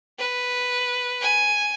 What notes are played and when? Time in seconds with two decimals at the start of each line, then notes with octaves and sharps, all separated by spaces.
0.18 B4
1.21 G#5